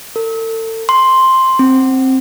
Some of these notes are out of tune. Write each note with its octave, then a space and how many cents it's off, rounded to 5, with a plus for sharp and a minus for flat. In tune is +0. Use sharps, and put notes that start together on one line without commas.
A4 +40
C6 +5
C4 +10